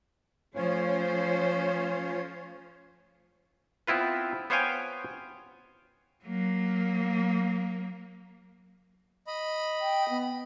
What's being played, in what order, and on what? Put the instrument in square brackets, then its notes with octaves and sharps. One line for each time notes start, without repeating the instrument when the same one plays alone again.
[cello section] F3 A3 C5 [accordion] C#4 F4 C#5
[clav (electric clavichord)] B3 C4 E4 F4 B4
B3 C5 C#5 F5 G5 G#5
[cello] F#3 A#3
[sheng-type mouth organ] D#5 B5
[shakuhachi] G5
B3